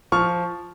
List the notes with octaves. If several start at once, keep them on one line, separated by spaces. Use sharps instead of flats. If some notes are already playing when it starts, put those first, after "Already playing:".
F3 C#6 F6